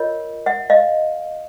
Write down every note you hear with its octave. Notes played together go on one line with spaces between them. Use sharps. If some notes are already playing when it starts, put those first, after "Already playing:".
Already playing: F4 A#4 C#5 D#5
E5 F#5
D#5 F5